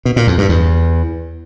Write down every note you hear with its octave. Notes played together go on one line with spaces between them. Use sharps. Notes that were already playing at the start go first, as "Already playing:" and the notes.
B2
A#2
F2
G2
E2